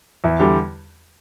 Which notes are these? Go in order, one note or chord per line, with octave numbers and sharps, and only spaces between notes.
E2 E4
D3 G3 G4